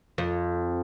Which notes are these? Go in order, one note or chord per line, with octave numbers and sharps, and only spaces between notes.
F2